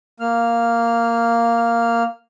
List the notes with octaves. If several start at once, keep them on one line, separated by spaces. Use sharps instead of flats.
A#3 F6